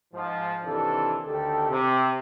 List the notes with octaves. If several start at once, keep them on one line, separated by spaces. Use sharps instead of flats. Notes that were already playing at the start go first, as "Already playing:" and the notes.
G#2 F3
C3 D#3 E3 D4 A4
D2 D#3 G4 A4
C3